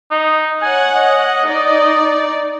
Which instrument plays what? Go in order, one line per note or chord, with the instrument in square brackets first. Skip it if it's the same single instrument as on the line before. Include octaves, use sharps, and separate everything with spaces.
[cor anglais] D#4
[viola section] C#5 F#5 [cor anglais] G#5
[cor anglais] D#5
[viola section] D#4 D5